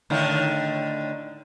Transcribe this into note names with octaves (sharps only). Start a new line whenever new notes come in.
A2 D3 D#3